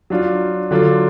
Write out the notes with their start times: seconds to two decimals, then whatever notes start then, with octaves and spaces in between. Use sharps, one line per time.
0.10 F#3 D4 F4
0.71 D3 F#3 D4 F4